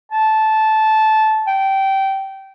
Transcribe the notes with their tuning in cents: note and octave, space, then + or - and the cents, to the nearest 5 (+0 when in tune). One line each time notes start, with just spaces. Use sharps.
A5 -15
G5 -20